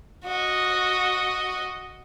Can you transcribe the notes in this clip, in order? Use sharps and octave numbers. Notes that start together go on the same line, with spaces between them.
F#4 D#5